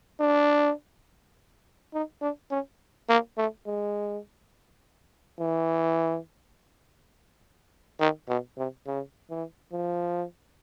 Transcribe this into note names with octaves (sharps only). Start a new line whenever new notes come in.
D4
D#4
D4
C#4
A#3
A3
G#3
E3
D#3
B2
C3
C#3
E3
F3